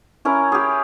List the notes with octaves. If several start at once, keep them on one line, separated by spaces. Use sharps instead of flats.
C#4 E4 A#4
G4 G#4